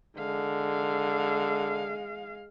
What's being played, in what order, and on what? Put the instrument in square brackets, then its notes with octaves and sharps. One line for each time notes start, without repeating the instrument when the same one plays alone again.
[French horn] D3 [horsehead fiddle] G#3 F5